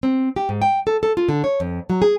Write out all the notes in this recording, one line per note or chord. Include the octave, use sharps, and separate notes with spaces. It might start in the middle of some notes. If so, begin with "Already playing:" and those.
C4
G4
G#2
G5
A4
A4
F4
D3
C#5
F2
F#3
G#4